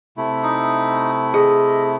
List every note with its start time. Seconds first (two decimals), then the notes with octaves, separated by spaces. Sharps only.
0.17 C3 A3 E4
0.43 D#4
1.34 G#4 D#5